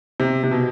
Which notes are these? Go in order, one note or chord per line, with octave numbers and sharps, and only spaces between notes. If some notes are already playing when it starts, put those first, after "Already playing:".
C3
C3
B2